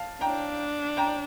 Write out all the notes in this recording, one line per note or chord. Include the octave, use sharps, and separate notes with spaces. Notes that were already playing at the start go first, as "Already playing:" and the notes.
Already playing: F5 A5
D4 G5 A#5
G5 A#5